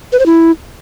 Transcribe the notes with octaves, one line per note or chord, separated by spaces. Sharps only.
B4
C5
E4